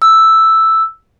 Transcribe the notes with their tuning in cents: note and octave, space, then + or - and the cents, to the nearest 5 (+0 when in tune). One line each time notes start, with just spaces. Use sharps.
E6 +0